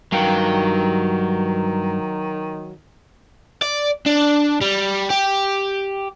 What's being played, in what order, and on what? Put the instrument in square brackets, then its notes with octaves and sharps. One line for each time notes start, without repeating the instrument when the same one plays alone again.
[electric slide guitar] G2 F5 G5 [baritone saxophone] D#3 [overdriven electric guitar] F#3
[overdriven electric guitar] D5
D4
G3
G4